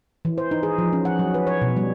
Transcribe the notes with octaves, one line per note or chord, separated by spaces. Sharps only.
E3
C5
D#4
G#4
F3
C#4
F#5
F#3
B4
C#5
B2
G3